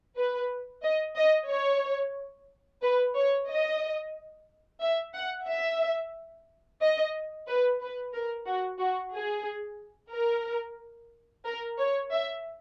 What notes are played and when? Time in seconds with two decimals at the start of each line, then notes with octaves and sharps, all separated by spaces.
0.17 B4
0.83 D#5
1.17 D#5
1.50 C#5
2.82 B4
3.17 C#5
3.49 D#5
4.82 E5
5.15 F#5
5.48 E5
6.82 D#5
7.48 B4
7.81 B4
8.15 A#4
8.47 F#4
8.80 F#4
9.14 G#4
10.13 A#4
11.46 A#4
11.79 C#5
12.12 E5